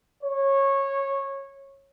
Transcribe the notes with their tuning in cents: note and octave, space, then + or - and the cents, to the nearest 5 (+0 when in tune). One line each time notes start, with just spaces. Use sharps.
C#5 -15